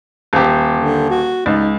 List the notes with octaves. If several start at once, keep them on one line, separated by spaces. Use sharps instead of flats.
D#1 G4
D3
F#4
C#2 D#4